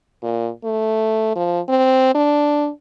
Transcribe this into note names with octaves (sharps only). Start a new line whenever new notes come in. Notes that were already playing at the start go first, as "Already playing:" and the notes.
A#2
A3
F3
C4
D4